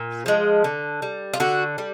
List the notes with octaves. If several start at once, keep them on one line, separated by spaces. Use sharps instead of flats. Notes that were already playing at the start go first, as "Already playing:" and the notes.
Already playing: A#2
F3 G#3
D3
G3
F4
D3 F#4
G3